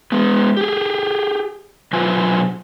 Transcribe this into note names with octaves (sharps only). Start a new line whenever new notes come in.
G#3 B3
G4 G#4
B2 F#3 F4 B4 C5 G#5